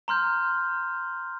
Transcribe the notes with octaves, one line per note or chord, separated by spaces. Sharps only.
A#5 C6 F6 G6